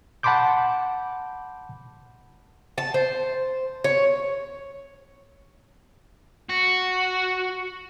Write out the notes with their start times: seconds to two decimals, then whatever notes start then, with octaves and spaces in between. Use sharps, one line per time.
0.23 F#5 A5 B5 C6 D6 G6
2.78 A5
2.94 C5
3.84 C#5
6.50 F#4